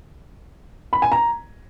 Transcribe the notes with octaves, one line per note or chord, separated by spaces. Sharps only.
B5
G#5
A#5